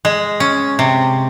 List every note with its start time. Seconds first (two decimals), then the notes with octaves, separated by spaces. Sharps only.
0.05 G#3
0.40 C#4
0.79 C3